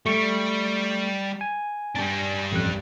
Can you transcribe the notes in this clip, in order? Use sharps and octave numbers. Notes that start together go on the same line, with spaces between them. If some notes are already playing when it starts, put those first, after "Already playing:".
G3 A3 C#6
G#5
G3 D4
A1 F2 F#6